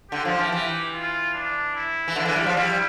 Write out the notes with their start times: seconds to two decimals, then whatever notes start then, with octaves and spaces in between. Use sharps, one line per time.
0.11 D3 G4
0.25 F3
0.39 E3
0.52 E3
0.93 F4
1.34 D4
1.75 E4
2.08 E3
2.16 D3 D4
2.25 E3
2.36 G3
2.46 F3
2.57 G3 E4